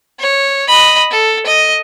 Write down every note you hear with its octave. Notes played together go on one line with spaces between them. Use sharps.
C#5
D#5 B5
A4
D#5